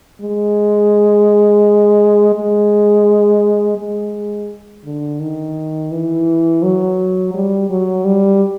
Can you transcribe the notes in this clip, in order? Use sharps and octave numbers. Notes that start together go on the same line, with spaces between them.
G#3
G#3
G#3
D3
D#3
E3
F#3
G3
F#3
G3